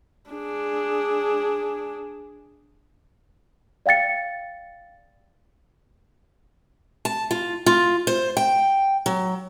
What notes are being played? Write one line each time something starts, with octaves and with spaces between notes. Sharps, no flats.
D4 G#4
D5 F5 G5 A6 C#7
A5
F4
F4
C5
G5
F#3